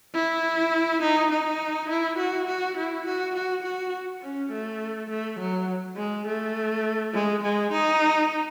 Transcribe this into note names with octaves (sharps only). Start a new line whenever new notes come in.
E4
D#4
D#4
E4
F#4
F#4
E4
F#4
F#4
F#4
C#4
A3
A3
F#3
G#3
A3
G#3
G#3
D#4